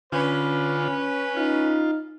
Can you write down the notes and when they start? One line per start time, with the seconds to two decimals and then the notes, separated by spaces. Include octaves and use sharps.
0.12 D3 C#4 F4 B4
1.37 D#4 F4